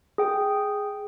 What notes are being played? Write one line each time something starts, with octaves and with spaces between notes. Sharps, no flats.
G#4 G5